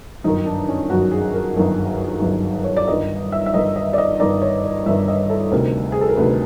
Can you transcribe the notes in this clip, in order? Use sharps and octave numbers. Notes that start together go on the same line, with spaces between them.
G1 F#2 D#3 D#4
D4
C#4
G1 F#2 D#3 F#4
G#4
A#4
G1 F#2 D#3
G1 F#2 D#3
C#5
D5
G1 G2 D#3 D#5
E5
E5
G1 G2 D#3 D#5
D#5
D5
D#5
G1 G2 D#3 D5
C#5
D5
G1 G2 D#3 E5
D#5
A4
D2 C3 D#3 A#4
G#4
A4
A#4
D2 C3 D#3 B4